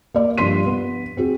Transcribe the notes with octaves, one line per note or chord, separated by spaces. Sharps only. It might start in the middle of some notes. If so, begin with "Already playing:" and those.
A#3 D5
G2 F3 C6 B6 D#7
B3
C4 F#4 G#4